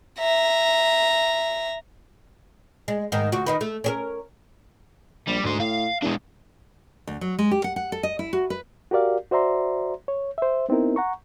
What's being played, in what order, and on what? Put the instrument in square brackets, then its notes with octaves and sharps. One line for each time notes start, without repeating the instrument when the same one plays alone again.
[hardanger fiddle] E5 A#5
[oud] G#3
G#2 D#3 D#4
D2 F#4
D#3 D#4 B4
A3
C#4 G#4 A#4
[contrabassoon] A#1 [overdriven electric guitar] G3
[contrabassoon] D2 [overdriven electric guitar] G#2 C5
[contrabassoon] A2 [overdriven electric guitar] F5
[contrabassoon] E2 [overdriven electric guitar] G#3 D4
[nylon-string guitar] D2
F#3
G#3
G4
F#5
F#5
A4
D#5
E4
F#4
B4
[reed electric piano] F#4 G4 A#4 D5 F5
F#4 C5 D5 E5 A#5 C6
C#5
C5 E5
B3 C4 D#4 E4 A#4
F#5 A#5 C#6